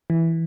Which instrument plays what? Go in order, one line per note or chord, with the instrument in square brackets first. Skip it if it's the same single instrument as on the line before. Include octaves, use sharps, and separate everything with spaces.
[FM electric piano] E3